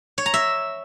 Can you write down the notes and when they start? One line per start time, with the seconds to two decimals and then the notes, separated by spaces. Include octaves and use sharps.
0.18 C#5
0.26 A#5
0.34 E5